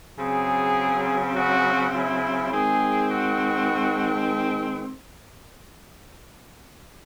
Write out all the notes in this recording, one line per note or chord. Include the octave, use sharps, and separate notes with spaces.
C#3 F#3 C4 G#4
F#4
E4
D#3 G#3 C4 G#4
F#4